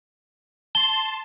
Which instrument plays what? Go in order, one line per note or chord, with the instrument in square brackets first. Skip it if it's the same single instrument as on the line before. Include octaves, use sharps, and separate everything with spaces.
[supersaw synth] A5 C6 [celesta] G7